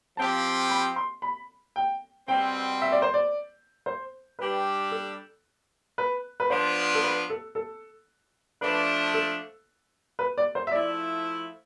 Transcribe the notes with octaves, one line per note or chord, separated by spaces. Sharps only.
F3 C4 G4 A5
B5
C6
B5
G5
B2 G3 C4 G5
E5
D5
C5
D5
C5
G3 D4 G4 B4
A4
B4
B4
F3 B3 D4 F4 C5
A4
B4
A4
A4
F3 A3 D4 B4
A4
B4
D5
C5
E5
F3 A3 E4 D5